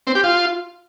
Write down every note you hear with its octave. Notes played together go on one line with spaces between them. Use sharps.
C4
G4
F4